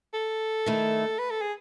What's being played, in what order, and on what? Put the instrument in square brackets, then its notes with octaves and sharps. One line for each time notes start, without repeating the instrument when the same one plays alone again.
[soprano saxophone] A4
[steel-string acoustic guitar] D#3 A3 E4
[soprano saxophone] B4
A4
G#4